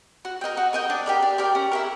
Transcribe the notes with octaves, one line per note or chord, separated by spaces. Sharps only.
F#4
A#4 D#5 G5
F#4
A#4 D#5 G5
D4
G4 A#4 D5
D4
G4 A#4 D5
C#4
E4 G4 A#4